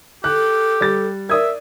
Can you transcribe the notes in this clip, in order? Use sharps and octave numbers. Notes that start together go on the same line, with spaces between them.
G4 A4 F#6
G3 A6
A#4 D5 E5 D#6 G#6